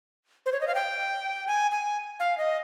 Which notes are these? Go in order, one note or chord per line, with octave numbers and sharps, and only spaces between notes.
C5
C#5
D#5
F5
G5
G#5
G#5
F5
D#5